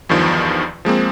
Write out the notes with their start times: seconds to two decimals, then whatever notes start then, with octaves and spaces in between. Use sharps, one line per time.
0.09 E2 G2 D#3 F3
0.85 F3 G#3 A#3 C4